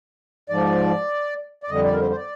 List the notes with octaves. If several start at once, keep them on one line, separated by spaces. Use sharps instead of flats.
G#2 F3 D5
D5
F2 D3 G3 D#5
D5
A#4
C5
C5
D5